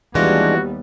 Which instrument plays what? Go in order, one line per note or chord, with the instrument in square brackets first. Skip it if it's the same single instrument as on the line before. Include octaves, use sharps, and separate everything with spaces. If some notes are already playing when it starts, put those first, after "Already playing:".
[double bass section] D#2 G3 B3 [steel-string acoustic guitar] E3 F4 [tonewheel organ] G#3 D4 [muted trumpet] F#4